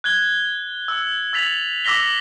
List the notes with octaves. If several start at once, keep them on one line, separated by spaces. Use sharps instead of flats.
F#6 G#6 G7
E6
E6 A6 B6 F7 F#7
D6 E6 A#6 B6 G7